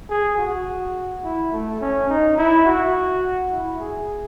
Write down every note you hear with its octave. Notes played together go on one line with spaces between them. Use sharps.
G#4
F#4
E4
A3
C#4
D#4
E4
F#4
E4
G#4